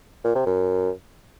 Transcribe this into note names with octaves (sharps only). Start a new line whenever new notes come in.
A#2
C3
F#2